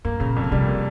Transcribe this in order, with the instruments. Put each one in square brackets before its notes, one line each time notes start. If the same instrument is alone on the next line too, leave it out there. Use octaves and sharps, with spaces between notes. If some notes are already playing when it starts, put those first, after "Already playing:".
[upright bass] G2 [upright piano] A#3
[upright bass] A#2 [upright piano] C#3
[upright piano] F2
[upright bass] A#2
[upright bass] C3 [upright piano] G3
[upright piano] A#3